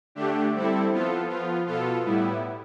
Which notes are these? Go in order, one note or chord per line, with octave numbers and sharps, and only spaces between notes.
D3 A3 D4 G4
G3 C4 E4 A4
F3 B3 F4 A4
F3 B3 F4
B2 B3 F4 A4
A2 G3 B3 E4